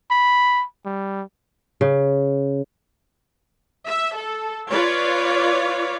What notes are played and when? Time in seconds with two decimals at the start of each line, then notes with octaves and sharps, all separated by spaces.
0.11 B5
0.85 G3
1.81 C#3
3.87 E5
4.16 A4
4.72 F4 B4 C#5 D5 F5